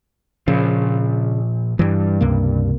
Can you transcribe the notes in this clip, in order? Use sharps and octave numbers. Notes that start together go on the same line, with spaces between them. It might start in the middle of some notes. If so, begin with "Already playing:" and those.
A#2 C#3 F3
G2 E3 G3
C#2 C3 A#3